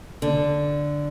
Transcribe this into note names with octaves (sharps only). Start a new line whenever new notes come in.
D3